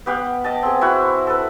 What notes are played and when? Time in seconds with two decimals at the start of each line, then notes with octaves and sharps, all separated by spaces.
0.06 B3 G4 F5 F#5
0.44 D#5 A5
0.62 C4 G#4
0.81 E4 F#4 C5 F#5
1.27 A4 B4